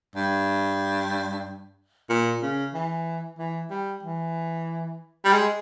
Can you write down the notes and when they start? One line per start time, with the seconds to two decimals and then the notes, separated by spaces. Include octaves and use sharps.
0.16 G2
2.10 A#2
2.42 C#3
2.74 E3
3.38 E3
3.70 G3
4.03 E3
5.25 G3
5.33 G#3